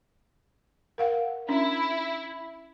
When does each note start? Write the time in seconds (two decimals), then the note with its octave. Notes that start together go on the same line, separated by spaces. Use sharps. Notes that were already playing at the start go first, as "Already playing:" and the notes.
0.98 A#4 F5 F#5
1.49 C#4 D4 E4